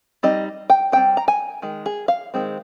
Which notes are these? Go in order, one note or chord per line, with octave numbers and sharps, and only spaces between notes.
G3 C4 D#4 D#5
G5
G3 C4 D#4 G5
A#5
G#5
D#3 G#3
G#4
F5
D#3 G#3 C4